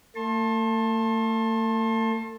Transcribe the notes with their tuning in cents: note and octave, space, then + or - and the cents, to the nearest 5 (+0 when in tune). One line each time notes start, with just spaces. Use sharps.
A3 +40 A5 +5 C6 +40